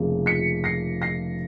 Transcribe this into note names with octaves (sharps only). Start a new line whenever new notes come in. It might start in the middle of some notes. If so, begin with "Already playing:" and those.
Already playing: F1 C#3 F3 A#3
B6 C#7
A#6 C7
A#6 C7